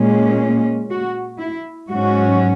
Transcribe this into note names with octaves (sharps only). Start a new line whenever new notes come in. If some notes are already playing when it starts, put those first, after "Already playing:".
Already playing: A#2 G#3 C#4
F#4
E4
G#2 F#3 C#4 F#4